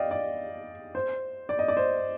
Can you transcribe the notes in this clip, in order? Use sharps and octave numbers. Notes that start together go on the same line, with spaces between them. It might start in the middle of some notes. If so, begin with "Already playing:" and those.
Already playing: D5 D#5 F5 G5
D5
C5
D5
D#5
D5
C5